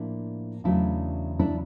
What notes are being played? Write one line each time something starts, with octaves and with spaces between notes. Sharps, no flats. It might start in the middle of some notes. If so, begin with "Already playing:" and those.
Already playing: A2 F3 A#3 D4 E4
E2 C#3 F#3 A3 D4 E4
D4 E4